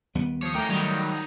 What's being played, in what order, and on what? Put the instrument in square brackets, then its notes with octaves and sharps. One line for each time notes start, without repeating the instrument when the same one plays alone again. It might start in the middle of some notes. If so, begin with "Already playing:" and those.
[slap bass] D#2 G3 B3
[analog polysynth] F3 D#6 [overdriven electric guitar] C#5
[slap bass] A3 [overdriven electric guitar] A#3 C#4 [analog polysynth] G5 A#5 G6
[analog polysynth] D#3 F#3 G3 [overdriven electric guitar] D#4 C#5